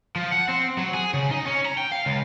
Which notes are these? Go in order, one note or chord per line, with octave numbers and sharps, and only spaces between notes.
F3
F#5
C4
F#3
G#4
C#3
D#4
C#4
A#5
G5
F5
C#2